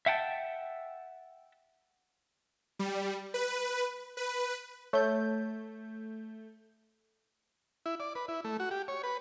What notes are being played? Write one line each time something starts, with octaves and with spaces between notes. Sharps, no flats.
E5 F#5 G5 A5
G3
B4
B4
A3 C#5 G6
E4
D5
B4
E4
A3
F#4
G4
C#5
B4